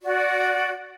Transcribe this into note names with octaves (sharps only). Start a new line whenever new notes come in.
F#4 D5